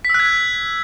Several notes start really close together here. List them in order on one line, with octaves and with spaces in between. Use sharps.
B6 E6 F#6 G#6